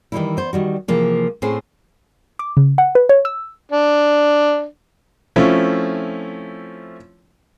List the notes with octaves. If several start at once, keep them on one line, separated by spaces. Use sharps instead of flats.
D#3 E3 G3 G#3 D#4 E4
B3 C5
D#3 G3 F#4
C3 E3 F3 A#3 G#4
A2 A3 C4 C#4 G#4 C5
D6
C#3
F#5
B4
C#5
E6
D4
F3 A3 C4 C#4 E4